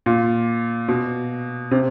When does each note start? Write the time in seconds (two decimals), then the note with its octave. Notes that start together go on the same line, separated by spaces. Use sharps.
0.06 A#2
0.88 B2
1.71 C3